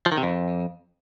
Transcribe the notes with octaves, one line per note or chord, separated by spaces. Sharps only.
F3
D#3
C3
F2